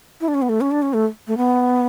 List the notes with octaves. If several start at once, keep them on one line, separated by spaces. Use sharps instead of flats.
E4
D4
C#4
B3
A3
C#4
D4
C#4
A3
A3
B3